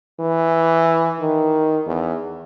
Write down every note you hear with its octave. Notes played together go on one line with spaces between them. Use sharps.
E3
D#3
E2